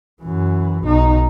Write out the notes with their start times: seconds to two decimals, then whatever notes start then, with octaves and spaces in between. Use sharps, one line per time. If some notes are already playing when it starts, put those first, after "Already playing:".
0.22 F#2 E3
0.85 B1 D#4